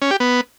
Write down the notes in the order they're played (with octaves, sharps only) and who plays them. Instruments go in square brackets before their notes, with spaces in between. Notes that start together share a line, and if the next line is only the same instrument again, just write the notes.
[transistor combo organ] C#4
G4
B3